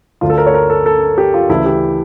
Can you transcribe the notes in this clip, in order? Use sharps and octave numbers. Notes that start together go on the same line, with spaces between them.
D2 D3 F4
A4
A#4
C#5
A#4
A4
A4
G4
F4
D2 C#3 E3 E4
G4